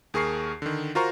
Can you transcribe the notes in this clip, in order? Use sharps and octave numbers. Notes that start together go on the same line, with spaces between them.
D#2 G#4 A#4 C#6 C7
D3 D#3
F4 F#4 A#4 C5 A#5 C#6